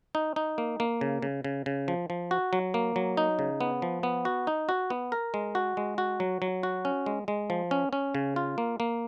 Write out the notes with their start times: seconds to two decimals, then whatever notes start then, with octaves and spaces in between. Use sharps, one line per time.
0.15 D#4
0.36 D#4
0.58 A#3
0.80 A#3
1.01 C#3
1.22 C#3
1.44 C#3
1.66 C#3
1.88 F3
2.10 F3
2.31 F#4
2.53 F#3
2.74 A#3
2.96 F#3
3.17 D#4
3.39 C#3
3.61 B3
3.82 F3
4.03 B3
4.25 F#4
4.47 D#4
4.69 F#4
4.90 B3
5.12 A#4
5.34 G#3
5.55 F#4
5.77 G#3
5.98 F#4
6.20 F#3
6.42 F#3
6.63 F#4
6.85 C#4
7.06 G#3
7.28 G#3
7.50 F3
7.71 C#4
7.93 C#4
8.15 C#3
8.36 F4
8.58 A#3
8.80 A#3